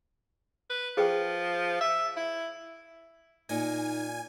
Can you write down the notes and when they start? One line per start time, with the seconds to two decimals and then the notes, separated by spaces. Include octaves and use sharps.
0.70 B4
0.97 F3 G#4 B4 G5
1.81 E5
2.17 E4
3.49 A#2 D#4 D#5 G#5